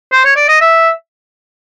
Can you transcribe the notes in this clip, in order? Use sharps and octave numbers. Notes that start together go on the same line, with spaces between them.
C5
C#5
D5
D#5
E5